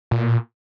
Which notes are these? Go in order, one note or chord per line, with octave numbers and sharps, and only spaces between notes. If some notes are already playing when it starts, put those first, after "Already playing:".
A#2